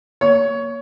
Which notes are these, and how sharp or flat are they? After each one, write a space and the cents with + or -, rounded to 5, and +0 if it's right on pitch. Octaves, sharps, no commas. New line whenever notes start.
C#5 +20